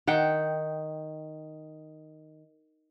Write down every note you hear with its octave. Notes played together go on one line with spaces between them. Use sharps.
D#3 F#5 G5